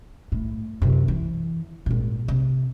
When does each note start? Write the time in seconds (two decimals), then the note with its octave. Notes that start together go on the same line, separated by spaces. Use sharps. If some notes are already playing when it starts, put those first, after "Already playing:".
0.32 A2
0.82 F#2 C3
1.08 E3
1.86 G#1 A#2
2.28 C3